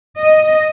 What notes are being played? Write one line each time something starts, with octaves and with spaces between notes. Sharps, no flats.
D#5